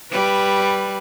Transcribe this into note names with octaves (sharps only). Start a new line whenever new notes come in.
G3 B4